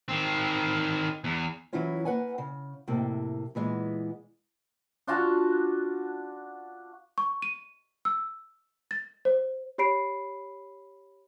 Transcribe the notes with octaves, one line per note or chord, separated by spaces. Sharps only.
D#3 C4
E2
E3 F#3 C#4 E4 F4 C#5
A#3 B4 F#5 G#5
C#3
F2 A2 C3 A#3
A#2 E3 G#3 B3
D4 F4 F#4 A5
C#6
D#7
E6
A6
C5
G4 C#5 B5 C7 D7